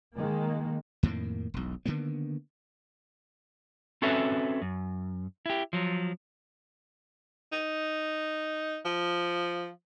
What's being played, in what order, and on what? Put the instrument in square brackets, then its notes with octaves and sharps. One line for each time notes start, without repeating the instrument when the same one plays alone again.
[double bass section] D#3 G#3 A#3
[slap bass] F2 A2 D#3 A#3
E1 B1
D3 D#3 A#3 B3
[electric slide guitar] C4 C#4 F#4 A4 B4 E5
F#2
E4 G4
F3 F#3
[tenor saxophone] D#4
F3